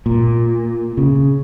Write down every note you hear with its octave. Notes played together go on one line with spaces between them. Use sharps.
A#2
C#3